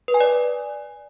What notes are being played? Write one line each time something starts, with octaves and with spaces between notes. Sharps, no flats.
B4
G#5
D5